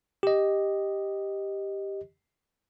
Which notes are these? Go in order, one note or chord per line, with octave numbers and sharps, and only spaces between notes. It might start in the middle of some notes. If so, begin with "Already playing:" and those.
G4 D#5